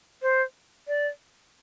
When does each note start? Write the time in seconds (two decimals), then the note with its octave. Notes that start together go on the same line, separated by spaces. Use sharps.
0.22 C5
0.88 D5